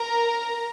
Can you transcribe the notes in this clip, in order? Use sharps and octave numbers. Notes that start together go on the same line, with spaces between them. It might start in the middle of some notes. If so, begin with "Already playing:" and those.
Already playing: A#4 A#5